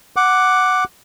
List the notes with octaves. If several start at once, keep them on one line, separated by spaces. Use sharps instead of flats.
F#5 D6